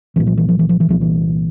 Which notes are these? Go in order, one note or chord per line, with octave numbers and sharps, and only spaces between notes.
C2 A#2 E3
F3
E3
F3
E3
F3
E3
C2 A#2 F3
E3